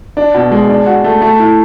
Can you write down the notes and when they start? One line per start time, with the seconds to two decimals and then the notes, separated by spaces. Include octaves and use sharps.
0.17 D4
0.34 B2
0.51 G#3
0.69 D4
0.86 F#4
1.04 A3
1.22 A3
1.39 E4